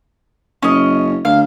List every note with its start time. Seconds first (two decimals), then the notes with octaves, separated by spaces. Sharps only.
0.62 F#1 C#4 D#5
1.25 D2 F5